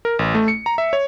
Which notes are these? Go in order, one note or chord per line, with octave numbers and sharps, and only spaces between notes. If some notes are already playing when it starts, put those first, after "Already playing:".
A#4
A1
A3
C#7
A#5
E5
C#5